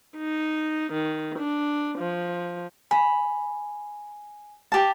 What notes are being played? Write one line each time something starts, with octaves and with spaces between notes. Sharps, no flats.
D#4
D#3
D4
F3
G#5 B5
G4 A5